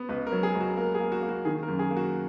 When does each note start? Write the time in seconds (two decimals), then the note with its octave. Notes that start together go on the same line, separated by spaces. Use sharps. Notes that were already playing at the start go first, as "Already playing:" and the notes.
Already playing: B3
0.09 C#2 B4
0.27 A#4
0.32 F#3
0.43 G#4
0.55 C#2
0.60 F#4
0.77 A#3 A#4
0.95 G#4
1.00 A#3
1.12 F#4
1.22 A#3
1.29 F#4
1.45 D#3 G#4
1.63 A#4
1.68 F#2
1.79 G#4
1.91 A#3
1.97 F#4